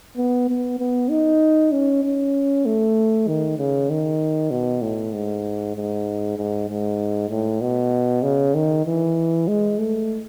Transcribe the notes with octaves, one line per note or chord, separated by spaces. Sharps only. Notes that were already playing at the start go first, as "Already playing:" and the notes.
B3
B3
B3
D#4
C#4
C#4
A3
D#3
C#3
D#3
B2
A2
G#2
G#2
G#2
G#2
A2
B2
C#3
D#3
E3
G#3
A3